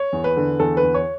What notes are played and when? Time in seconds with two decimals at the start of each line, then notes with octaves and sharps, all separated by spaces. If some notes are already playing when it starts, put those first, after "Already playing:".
Already playing: C#5
0.13 E2
0.24 B4
0.37 D3
0.60 E2 A4
0.77 B4
0.83 E2
0.94 C#5